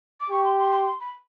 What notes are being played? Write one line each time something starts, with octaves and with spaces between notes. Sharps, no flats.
D6
G4 C#6
C6
C6
C6
C6
B5